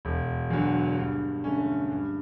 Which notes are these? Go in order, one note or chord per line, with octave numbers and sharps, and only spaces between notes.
E1
E2 D3 F#3
G2
D3 A3 C#4
G2